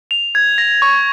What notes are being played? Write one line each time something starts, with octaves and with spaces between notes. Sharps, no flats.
F7
G#6
A#6
C#6